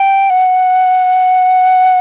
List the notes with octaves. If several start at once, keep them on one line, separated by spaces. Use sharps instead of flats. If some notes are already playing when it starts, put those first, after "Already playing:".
Already playing: G5
F#5